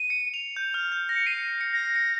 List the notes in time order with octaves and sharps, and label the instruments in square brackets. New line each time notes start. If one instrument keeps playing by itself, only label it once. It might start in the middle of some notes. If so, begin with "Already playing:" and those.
Already playing: [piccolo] D#7
[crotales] C#7
F7
G6
F6
G6
A#6
[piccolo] C#7
[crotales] C7 [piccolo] D#7
[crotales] C#7
[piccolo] A#6
[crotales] C#7